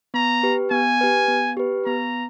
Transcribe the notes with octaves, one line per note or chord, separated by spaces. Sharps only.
B3 A#5
G4 B4
B3 G#5
G4 B4
B3
G4 B4
B3 A#5